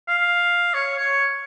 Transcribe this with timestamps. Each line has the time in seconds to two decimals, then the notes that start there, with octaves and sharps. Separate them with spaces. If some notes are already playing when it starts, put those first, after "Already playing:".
0.08 F5
0.74 C#5
0.98 C#5